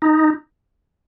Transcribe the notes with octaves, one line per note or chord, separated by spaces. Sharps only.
D#4